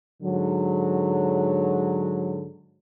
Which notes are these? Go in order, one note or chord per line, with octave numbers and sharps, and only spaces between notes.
G#2 D3 F#3